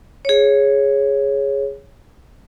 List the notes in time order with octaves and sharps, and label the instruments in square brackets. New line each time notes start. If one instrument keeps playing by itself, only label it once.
[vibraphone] G#4 C#5